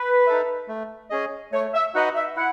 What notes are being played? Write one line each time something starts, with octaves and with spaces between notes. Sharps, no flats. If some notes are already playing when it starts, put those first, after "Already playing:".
Already playing: B4
D#4 A4 E5
A3
C#4 G#4 D#5
A3 C#5
E5
D#4 F#4 B4 D#5 F#5
E5
E4 F#5